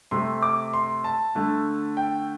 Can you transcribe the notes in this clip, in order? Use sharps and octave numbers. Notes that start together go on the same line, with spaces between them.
C3 A3 C6
D6
C6
A5
D3 A3
G5